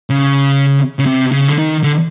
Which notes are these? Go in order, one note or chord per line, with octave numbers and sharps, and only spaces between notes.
C#3
C#3
C3
C#3
D3
D#3
D3